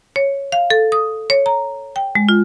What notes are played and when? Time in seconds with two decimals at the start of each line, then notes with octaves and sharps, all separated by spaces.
0.16 C#5
0.52 F5
0.70 A4
0.92 D#6
1.30 C#5
1.46 A#5
1.96 G5
2.15 G#3
2.29 F4